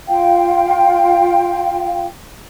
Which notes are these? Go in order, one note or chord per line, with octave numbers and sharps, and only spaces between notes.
F4 F5 G5